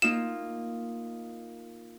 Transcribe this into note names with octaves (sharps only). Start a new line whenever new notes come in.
A#3 D#4 F4 E7